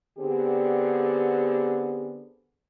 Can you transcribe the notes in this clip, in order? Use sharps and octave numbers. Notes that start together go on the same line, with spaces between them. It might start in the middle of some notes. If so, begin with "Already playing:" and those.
D3 B3 C4 D4 G4 G#4